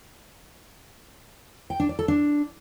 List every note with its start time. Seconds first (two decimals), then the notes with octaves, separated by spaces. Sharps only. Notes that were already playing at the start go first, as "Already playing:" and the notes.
1.70 G5
1.80 D4
1.89 D5
1.99 A4
2.08 D4